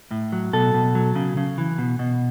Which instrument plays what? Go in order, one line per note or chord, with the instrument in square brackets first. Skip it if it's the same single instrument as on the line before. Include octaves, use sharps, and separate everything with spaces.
[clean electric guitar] A2
F#3
B2 A4
B2
F#3
C#3
C#3
E3
B2
B2